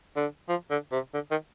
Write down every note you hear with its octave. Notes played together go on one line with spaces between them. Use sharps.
D3
F3
D3
C3
D3
D#3